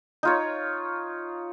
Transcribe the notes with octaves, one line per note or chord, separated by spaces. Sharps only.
D#4 F4 C#5